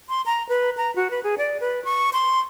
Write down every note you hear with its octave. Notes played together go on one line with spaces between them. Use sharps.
C6
A#5
B4
A#5
F#4
B4
G#4
D5
B4
C#6
C6